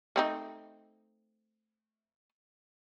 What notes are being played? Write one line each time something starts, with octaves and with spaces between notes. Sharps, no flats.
A3 C4 D#4